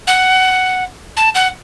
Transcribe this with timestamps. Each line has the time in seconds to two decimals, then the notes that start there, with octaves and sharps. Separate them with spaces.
0.07 F#5
1.17 A5
1.35 F#5